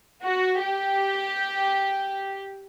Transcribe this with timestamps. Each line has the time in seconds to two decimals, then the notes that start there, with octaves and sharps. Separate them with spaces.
0.24 F#4
0.62 G4